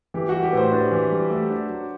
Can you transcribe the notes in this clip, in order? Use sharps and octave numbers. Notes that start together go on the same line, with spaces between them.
E3 G4
F#4
G3
G4
A2 B4 C5
D4 B4
E3
G3
A3
D4
F#3